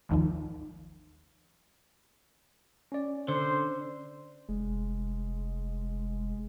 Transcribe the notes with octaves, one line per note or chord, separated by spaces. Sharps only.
G#1 D#2 D#3 F3
C#4 D5
D3 C5
F1 G#3